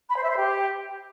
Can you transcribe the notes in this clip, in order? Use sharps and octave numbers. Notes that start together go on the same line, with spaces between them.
B5
C5
E5
C5
G4